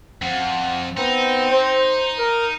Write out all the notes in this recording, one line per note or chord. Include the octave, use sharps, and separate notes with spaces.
F2 F#5
B3 C4 D#4
C5
A#4